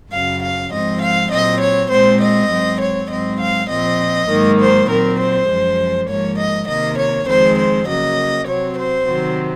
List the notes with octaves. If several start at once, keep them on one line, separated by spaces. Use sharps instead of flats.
F#2 C#3 F#3 F5
F5
G#2 F3 C4 D#5
F5
A#2 F#3 C4 D#5
C#5
A#2 G#3 C4 C5
D#5
G#2 F#3 C4
C#5
G#2 F#3 C4 D#5
F5
A#2 F3 C4 D#5
G#2 D#3 F#3 A#3
C5
A#2 F#3 C4 A#4
C5
F#2 F3 G#3
G#2 F3 A#3 C#5
D#5
C3 D#3 A#3 D#5
C#5
F2 D#3 G#3 C4 C5
C5
C#3 F#3 A#3 D#5
C3 F#3 C4 C#5
C5
C3 D#3 F#3 C4